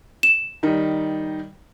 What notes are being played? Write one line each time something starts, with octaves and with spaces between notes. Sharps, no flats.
E7
D#3 G3 D#4